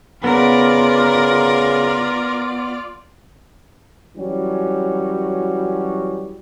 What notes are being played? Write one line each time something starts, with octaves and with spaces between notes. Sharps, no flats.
C#3 B3 F4 A#4 D5
E3 F#3 G3 C#4 F#4